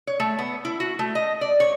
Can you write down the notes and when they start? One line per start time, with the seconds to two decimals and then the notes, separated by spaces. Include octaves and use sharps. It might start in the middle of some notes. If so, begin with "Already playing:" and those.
0.07 C#5
0.20 A3
0.39 B3
0.65 E4
0.80 F#4
0.99 A3
1.15 D#5
1.41 D5
1.60 C#5